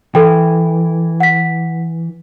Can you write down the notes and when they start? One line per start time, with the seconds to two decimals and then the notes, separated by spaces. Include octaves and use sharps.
0.15 E3 A4 G5
1.20 F#5 B6